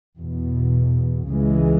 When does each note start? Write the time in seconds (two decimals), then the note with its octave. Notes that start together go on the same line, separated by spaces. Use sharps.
0.18 E2 B2
1.29 C#2 C#3 E3 G#3